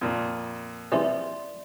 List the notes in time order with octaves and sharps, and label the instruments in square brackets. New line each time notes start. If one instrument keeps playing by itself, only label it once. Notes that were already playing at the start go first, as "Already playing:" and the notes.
[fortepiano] F2 A#2
[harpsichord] C3 E3 G3 [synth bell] D5 E5 C6